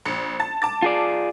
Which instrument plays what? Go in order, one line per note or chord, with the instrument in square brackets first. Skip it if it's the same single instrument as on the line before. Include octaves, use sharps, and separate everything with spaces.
[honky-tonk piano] A#1 C#7
A5 A6
A5 D6 A6
[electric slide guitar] F4 G#4 D5